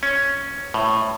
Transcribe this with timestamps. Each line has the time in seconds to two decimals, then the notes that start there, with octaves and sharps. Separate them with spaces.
0.03 C#4
0.74 A2